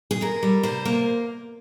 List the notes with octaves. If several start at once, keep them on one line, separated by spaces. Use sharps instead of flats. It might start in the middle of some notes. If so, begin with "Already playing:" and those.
G#4
F2 A#4
G3
C3 C5
A#3